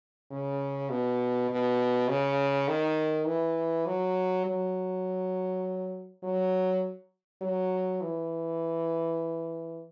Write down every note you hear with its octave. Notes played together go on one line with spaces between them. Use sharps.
C#3
B2
B2
C#3
D#3
E3
F#3
F#3
F#3
F#3
E3